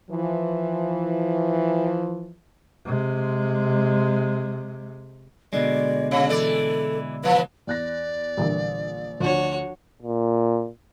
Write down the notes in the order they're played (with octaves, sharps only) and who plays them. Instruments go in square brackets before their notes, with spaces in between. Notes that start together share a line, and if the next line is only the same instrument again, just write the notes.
[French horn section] E3 F3
[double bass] C3 G#3
[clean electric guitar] B2 D3 G#3 [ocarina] D5
[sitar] C#3 [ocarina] C#5
[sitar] E3 D5 [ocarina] A4
[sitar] E3 F3 [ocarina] B4
[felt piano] E2 F#6 A#6 [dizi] D5
[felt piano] A#1 A#4 [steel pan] D3 E3 G3
[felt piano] D2 [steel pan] F3 D4 [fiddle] F#4 C#5
[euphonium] A#2